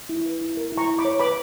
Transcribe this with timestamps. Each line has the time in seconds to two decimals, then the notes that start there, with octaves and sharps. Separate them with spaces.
0.09 E4
0.26 B4
0.41 E4
0.57 A#4
0.72 E4
0.78 A#5 C#6
0.89 E4
0.99 B5 D6
1.05 C#5
1.20 B4 B5 D6